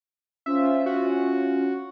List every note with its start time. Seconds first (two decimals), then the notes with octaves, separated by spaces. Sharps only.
0.46 C#4 F4 C5 E5
0.86 C#4 F4 F#4